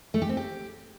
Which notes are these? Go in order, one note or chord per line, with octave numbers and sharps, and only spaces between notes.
A3
G4
C4
G4